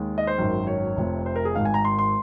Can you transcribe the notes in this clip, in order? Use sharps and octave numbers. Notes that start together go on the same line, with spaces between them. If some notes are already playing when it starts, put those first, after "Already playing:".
Already playing: D#2 D#3 G#3
D#5
C5
G#1 F#2 D#3
C#5
F1 F2 C3
C5
A#4
G#4
G#1 G#2 D#3 F5
G#5
A#5
C6
C6